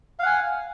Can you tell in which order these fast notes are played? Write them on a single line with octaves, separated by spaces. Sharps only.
F5 F#5 G#5